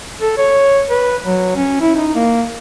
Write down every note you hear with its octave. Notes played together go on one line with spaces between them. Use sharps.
A4
C#5
B4
F#3
C#4
E4
D#4
A#3